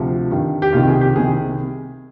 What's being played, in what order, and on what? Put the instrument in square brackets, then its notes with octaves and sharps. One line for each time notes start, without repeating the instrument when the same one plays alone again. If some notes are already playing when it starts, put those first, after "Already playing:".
Already playing: [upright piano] D2 C3 F3
G2 D#3
G4
C2 C3 D#3 F4
G#4
G4
C2 C3 D#3 G#4